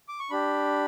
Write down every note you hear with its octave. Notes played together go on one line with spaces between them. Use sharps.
D6
C#6
D4 G4 B5